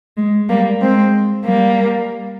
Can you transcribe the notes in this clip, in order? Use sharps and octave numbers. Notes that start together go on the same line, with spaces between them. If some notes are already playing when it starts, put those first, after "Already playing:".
G#3
G3 A#3
G#3 C4
G3 A#3